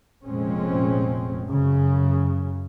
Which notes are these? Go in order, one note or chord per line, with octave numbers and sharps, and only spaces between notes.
F1 F2 A#2 G#3 C4 C#4
F#2 C#3